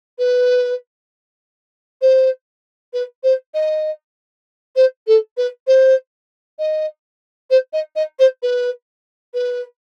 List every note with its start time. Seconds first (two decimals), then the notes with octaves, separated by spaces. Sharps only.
0.18 B4
2.01 C5
2.93 B4
3.23 C5
3.54 D#5
4.76 C5
5.07 A4
5.37 B4
5.67 C5
6.59 D#5
7.50 C5
7.73 D#5
7.95 D#5
8.19 C5
8.42 B4
9.34 B4